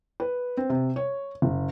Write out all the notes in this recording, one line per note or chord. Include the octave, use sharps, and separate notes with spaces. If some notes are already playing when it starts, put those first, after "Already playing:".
B4
C4
C3
C#5
F#1